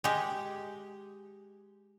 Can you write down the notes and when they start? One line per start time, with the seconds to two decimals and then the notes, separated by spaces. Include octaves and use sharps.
0.04 G#3 G4